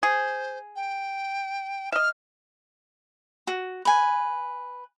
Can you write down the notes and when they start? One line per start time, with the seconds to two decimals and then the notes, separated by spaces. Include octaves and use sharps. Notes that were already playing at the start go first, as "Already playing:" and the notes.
0.03 G#4 C5
0.76 G5
1.92 D#5 E5 F6
3.47 F#4
3.85 B4 G#5